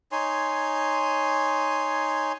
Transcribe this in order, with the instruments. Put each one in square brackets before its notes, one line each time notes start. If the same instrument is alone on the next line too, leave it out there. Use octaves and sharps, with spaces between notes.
[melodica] D#4 C#5 G#5 C6